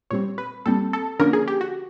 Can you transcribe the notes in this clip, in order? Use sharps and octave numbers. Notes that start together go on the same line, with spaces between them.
A#2 G3 C4 C#5
B4
A#2 G3 C4 A4
A4
D3 F3 A#3 C#4 A#4
G#4
G4
F#4